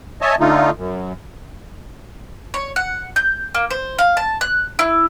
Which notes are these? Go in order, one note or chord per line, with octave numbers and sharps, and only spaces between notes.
C#5 D#5 E5 G#5 A5
D3 A3 D#4 F4
F#2
C#5
F#5
G6
A#3
C5
F5
A5
F#6
E4